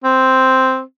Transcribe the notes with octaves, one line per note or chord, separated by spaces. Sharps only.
C4